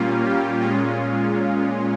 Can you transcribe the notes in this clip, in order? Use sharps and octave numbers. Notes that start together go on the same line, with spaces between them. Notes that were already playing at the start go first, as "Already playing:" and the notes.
Already playing: A#2 G3 A#3 C#4 F4
G4
A#2 G#3 C#4 F4